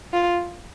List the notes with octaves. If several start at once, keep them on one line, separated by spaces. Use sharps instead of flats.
F4